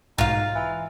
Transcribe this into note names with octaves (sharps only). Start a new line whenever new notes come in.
B1 G#2 D#4 F4 F5
E3